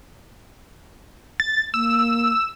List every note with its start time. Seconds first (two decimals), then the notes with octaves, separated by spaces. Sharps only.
1.40 A6
1.74 A#3 E6